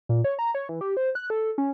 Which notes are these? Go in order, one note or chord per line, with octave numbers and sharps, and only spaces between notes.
A#2
C#5
A#5
C#5
E3
G4
C5
F#6
A4
C#4